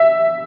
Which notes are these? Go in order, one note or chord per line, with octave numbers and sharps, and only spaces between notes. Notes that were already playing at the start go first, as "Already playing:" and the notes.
Already playing: E5